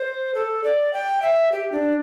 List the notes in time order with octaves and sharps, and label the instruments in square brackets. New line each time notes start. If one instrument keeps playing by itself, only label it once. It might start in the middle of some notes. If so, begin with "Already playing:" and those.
Already playing: [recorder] C5
A4
D5
G5
E5
G4
D4